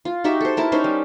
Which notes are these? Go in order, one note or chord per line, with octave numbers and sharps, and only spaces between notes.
F4
D#4 F#4 G4 E5
A4 C5
E4 A#4 A5
C#4 D#4 C5
G3